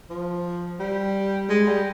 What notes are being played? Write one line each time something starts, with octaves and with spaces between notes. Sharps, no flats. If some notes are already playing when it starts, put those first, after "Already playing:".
F3
G3
G#3
G3